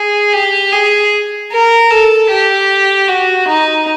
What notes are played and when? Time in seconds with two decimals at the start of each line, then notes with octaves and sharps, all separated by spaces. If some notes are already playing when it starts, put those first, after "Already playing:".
Already playing: G#4
0.33 G4
0.73 G#4
1.52 A#4
1.91 A4
2.30 G4
3.08 F#4
3.48 D#4